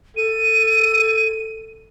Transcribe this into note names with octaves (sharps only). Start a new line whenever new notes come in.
A4 D#7